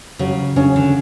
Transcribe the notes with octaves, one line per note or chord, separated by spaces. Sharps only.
C#3 F#3
C#3 C#4
D3